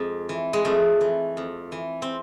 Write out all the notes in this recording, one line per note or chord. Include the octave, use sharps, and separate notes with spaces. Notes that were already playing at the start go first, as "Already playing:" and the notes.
Already playing: F2 G#3
E3
G#3
F2 A3
E3
F2
E3
C4